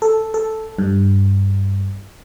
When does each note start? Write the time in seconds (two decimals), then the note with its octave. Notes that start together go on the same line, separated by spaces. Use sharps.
0.02 A4
0.34 A4
0.78 G2